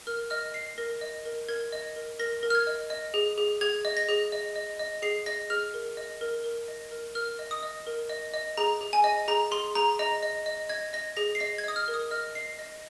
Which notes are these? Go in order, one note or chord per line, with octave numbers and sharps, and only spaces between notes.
A#4 F6
D#5 F6
D#5 C7
A#4 A#6
D#5
A#4
A#4 G#6
D#5
A#4
A#4 A#6
A#4
F6
G#6
D#5
D#5
G#4
G#4
G#4 G#6
D#5
A#6
G#4
D#5
D#5
D#5
G#4 C7
D#5 A#6
G#4 F6
A#4
D#5
A#4
A#4
D#5
A#4
A#4 F6
D#5
D#6
D#5
A#4
D#5
D#5
G#4 A#5
G#4
G#5
D#5
G#4 A#5
G#4 C6
G#4 A#5
D#5 A#5
D#5
D#5
D#5 G#6
D#5 A#6
G#4 A#6
C7
D#5 A#6
G#6
D#5 D#6
F6
A#4
D#6
D#5 F6
D#5 C7
D#5 A#6